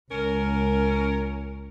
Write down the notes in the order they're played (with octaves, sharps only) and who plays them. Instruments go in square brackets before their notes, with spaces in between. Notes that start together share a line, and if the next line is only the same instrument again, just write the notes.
[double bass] C#2 [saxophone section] C#4 A#4